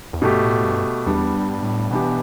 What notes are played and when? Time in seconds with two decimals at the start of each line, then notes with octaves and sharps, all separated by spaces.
0.13 E2
0.22 G2 B2 A3 G4
0.43 A2
0.64 G2
1.06 E2 G3 B3 D4
1.34 G2
1.62 A2
1.91 B2 E3 B3 D4 G4